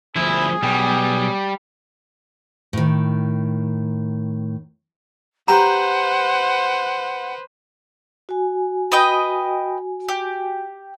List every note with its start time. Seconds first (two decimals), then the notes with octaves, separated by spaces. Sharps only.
0.16 D2 F3 E4 G#4
0.63 B1 G3
2.73 A2 D#3
5.48 G4 B4 C5 F#5 A#5
8.29 F#4 G#5
8.92 B4 D#5 G5
10.09 G4